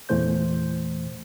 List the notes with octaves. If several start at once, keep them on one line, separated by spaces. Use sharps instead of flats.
E2 A#2 E3 A3 C5 G6